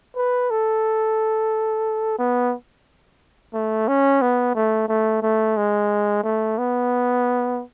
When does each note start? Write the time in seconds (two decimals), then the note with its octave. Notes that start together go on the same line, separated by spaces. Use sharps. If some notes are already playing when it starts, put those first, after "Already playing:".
0.16 B4
0.50 A4
2.18 B3
3.54 A3
3.88 C#4
4.22 B3
4.55 A3
4.88 A3
5.22 A3
5.57 G#3
6.23 A3
6.58 B3